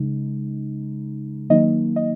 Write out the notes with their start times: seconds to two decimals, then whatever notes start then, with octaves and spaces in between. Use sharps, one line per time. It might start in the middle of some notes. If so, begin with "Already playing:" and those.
Already playing: C#3 G#3 D#4
1.50 D#3 F#3 A#3 D#4 D#5
1.96 D#5